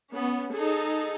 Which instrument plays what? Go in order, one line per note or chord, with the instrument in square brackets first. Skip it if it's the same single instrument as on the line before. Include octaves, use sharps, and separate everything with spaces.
[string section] B3 C#4
D#4 G#4 A4